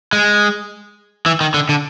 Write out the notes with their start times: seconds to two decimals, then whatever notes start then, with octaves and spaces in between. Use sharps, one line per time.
0.13 G#3
1.26 E3
1.41 D#3
1.54 D3
1.69 D3